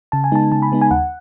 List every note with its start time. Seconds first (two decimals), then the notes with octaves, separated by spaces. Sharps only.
0.12 C#3 A5
0.24 G#5
0.32 G#3 B3 D#4 A5
0.52 C#3 A5
0.62 B5
0.72 G#3 B3 D#4
0.81 G#5
0.91 D#2 F#5